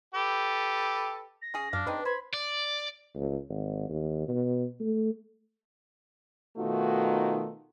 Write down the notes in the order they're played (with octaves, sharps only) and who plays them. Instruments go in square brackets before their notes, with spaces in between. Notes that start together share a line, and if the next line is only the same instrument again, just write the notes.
[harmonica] G4 A4 B4
[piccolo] A#6
[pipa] C#3 G#4
[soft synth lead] F#2 [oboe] D4 [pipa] F5
[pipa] G#3 C4 D#4 [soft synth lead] B4
[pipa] C5 [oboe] B5 [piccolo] G#6
[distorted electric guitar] D5
[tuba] C#2
G#1
D#2
B2
A3
[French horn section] B2 D#3 A3 D#4 F4 F#4